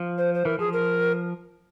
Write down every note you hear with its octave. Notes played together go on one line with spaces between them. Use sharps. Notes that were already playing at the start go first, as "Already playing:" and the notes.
Already playing: F3
C5
C5
E3 A#4
F3 G#4
A#4